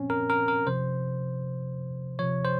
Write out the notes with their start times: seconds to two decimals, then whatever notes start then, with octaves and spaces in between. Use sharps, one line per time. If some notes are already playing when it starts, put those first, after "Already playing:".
Already playing: A#2 F3 C4 C#4
0.10 A#4
0.30 A#4
0.48 A#4
0.67 C3 F3 C5
2.19 C3 F3 C#5
2.45 C5